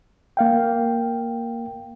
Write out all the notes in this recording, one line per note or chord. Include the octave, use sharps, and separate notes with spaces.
A#3 F5 G5